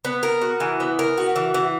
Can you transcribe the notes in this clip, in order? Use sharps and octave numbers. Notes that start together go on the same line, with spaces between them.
B3
A#4
F#4
E3
B3
A#4
F#4
E3
E3